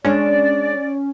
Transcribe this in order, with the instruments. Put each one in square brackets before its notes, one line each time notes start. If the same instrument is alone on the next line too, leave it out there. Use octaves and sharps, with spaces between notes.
[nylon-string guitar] G#3 D4 [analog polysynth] C#4 [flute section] D5